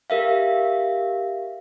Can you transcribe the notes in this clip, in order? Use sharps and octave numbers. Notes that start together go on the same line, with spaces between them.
G4 A#4 E5 F5